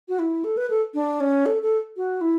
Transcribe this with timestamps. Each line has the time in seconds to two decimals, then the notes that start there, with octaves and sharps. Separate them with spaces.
0.09 F#4
0.19 E4
0.44 A4
0.57 B4
0.70 A4
0.94 D4
1.20 C#4
1.46 A4
1.62 A4
1.97 F#4
2.21 E4